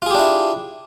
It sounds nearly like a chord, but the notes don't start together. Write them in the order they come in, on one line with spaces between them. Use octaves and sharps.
F4 G#4 G4 D4 E4